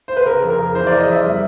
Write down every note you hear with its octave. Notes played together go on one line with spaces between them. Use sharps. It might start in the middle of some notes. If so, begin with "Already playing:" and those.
C5
B4
C#3 A#4
F2
A#4
C#3
E3 C5
C#3 D5
D#5
F2 E5
G3 E5